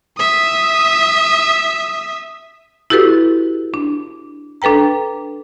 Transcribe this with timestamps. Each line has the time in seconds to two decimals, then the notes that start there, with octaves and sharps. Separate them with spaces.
0.17 E5 D#6
2.90 E4 F#4 G4 A4 B4
3.74 D4
4.62 D4 A4 B4 G5 A#5